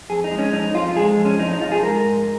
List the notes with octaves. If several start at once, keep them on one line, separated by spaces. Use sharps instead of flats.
F2 G#4
D#4
G#3
C#4
F2 D#4
F3 F4
G#3 G#4
F2
C#4
F3 D#4
D#4
F3 F4
G#4
G#3 A#4
G#2